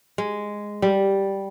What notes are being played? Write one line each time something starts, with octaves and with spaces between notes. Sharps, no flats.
G#3
G3